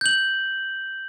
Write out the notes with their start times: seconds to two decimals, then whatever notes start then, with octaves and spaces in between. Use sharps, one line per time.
0.01 G6 F#7